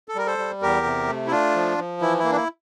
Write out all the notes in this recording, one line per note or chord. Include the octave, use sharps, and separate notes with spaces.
A4
G3 A#4
A4 C5
G3
E2 G4 A#4
C3
A3
E4
A3 D4 F4
F3
F3
E3 E4
E4
A#3
D4
E4